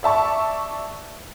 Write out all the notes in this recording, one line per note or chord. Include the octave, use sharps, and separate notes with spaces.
D5 E5 A5 C#6